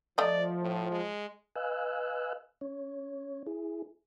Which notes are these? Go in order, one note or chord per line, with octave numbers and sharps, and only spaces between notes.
F3 A3 D5 D#5
A2
G#3
B4 D#5 F5 G#5 E6 F#6
C#4 C#5
E4 G#4